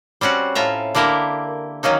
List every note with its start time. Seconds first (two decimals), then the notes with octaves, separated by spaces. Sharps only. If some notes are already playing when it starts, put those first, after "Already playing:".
0.21 G3 C4 C#4 F#4 F#5
0.55 A2 F4 E5 A#5
0.95 D3 A#3 E4 G4 A#4
1.83 D#3 F#3 A#3 C#4 D#4